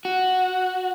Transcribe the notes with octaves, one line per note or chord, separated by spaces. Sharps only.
F#4